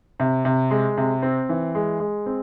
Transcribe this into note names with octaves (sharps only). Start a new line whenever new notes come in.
C3
C3
G#3
C3
C4
E3
G#3
G#3
C4